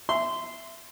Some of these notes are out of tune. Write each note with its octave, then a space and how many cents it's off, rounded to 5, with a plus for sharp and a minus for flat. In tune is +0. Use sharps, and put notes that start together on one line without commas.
E5 +10 C6 -15